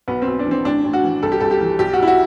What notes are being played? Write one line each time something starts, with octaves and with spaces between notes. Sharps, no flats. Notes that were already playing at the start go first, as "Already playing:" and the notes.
B1 B3
C4
B1
D4
E3
C4
A1 D4
A1
F#4
E3
C2 A4
G4
C2 A4
G4
E3
B1 G4
F#4
B1 E4
F#4